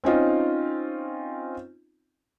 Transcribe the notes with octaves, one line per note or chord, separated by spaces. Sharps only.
C4 C#4 D#4 F4